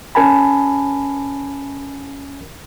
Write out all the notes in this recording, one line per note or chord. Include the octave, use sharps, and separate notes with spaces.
C#4 A#4 G#5 A5 B5